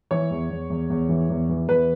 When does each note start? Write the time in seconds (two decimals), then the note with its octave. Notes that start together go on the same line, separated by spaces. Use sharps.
0.11 E3 C#5
0.31 E2
0.50 E2
0.70 E2
0.90 E2
1.09 E3
1.30 E2
1.49 E3
1.68 E2 B4